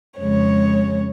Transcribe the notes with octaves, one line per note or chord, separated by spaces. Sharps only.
F2 C#3 G#3 C#5